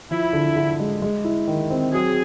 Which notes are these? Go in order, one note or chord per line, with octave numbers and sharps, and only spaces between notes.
F3 E4
D3
D3
G#3
G#3
E4
D#3
C4
F#3 G#4